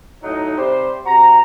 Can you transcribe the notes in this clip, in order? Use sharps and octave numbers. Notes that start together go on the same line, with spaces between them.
A2 F#3 D#4
C3 G3 C5
C3 F#4 A#5